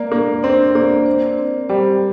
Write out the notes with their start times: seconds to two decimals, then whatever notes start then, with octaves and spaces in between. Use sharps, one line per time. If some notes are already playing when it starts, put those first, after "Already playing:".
Already playing: A#3 D5
0.12 A#3 D4
0.43 C4 D4
0.75 A#3 D5
1.06 C5
1.39 C4
1.69 G3 C5